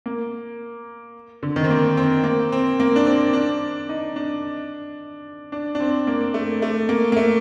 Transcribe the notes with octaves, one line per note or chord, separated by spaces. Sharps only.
A#3
D3
D#3
C4
A#3
C4
A#3
C4
A#3
D4
C4
D4
D#4
D4
D4
D4
C4
A#3
A3
A3
A#3
A#3
A3